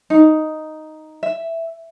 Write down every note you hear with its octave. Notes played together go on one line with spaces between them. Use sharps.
D#4
E5